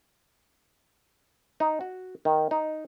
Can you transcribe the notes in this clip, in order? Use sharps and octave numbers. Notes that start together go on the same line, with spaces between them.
D#4
F#4
D#3
D#4